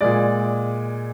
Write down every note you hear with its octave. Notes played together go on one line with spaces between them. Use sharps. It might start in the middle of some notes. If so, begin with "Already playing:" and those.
A#2 G#3 D5